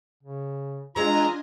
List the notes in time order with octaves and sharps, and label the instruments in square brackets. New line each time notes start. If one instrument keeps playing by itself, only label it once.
[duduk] C#3
[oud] E3 G#3 [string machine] D4 D#5 G#5 [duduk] F4 [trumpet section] A#5